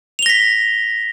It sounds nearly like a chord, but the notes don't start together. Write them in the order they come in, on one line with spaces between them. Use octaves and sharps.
F7 G7 A#6 B6